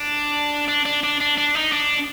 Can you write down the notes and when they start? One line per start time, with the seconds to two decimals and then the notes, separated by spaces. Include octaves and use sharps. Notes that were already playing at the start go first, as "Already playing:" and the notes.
Already playing: D4
0.68 D4
0.86 D4
1.03 D4
1.20 D4
1.37 D4
1.55 D#4
1.72 D4